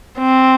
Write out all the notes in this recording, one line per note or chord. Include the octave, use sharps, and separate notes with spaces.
C4